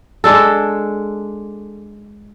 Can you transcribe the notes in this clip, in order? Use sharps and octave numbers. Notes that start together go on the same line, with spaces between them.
G#3 D4 A4